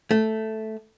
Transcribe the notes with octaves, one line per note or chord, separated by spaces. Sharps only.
A3